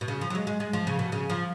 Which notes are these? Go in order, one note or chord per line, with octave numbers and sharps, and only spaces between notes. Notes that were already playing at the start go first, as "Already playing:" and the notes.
B2
C#3
F3
F#3
G#3
G#3
G#3
F3
C#3
B2
C#3
F3